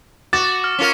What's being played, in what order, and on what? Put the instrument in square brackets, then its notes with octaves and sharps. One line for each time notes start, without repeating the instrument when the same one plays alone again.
[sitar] F#4 [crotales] D6 [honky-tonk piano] A6
[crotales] F6
[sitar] C#4 F4 A#4